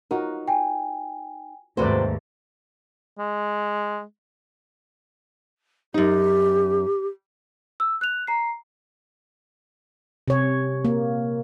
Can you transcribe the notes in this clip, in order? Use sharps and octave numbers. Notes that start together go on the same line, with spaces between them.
D#4 F4 F#4 A#4
G5 G#5
D#2 G#2 C3 A3 F#4 B4 C5 D5
G#3
F#2 D#4 G4
E6
F#6 F7
A#5 C7
C3 C#5
A#3